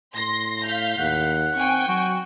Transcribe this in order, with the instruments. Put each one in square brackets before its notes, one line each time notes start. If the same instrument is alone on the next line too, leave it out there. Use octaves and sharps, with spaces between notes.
[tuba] A2 [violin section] C6 A#6
[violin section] F5 G6 B6
[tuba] D#2 [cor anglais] F#5
[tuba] C4 [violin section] G5 G#5 C#6
[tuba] F#3 [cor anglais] F#4